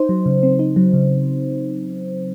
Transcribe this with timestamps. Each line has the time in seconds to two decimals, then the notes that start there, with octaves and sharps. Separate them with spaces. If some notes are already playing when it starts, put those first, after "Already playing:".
Already playing: D#4 C5
0.09 F#3
0.26 C#3
0.43 C4
0.59 D#4
0.76 F#3
0.93 C#3